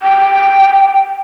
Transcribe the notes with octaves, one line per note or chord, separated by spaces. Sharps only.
G5